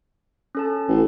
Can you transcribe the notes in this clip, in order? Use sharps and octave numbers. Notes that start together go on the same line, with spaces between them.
C#4 A4 A5
A1